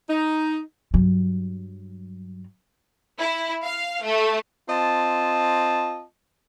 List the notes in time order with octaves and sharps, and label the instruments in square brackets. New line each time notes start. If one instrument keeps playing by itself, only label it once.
[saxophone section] D#4
[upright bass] G2 F#3
[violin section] E4
F5
A3
[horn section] C4 F4 D#5 A5